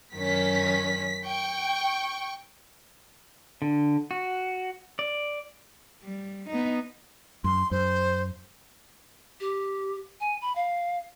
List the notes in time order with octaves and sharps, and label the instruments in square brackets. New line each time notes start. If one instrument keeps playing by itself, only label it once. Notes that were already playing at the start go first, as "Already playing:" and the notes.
[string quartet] F#2 D#3 C#4 [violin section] B6
[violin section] G5 [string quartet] C#6
[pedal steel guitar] D3
F#4
D5
[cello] G3
B3 D#4
[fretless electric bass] F#2 [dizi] C6
[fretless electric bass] F#2 [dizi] C5
[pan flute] G4
G#5
B5
F5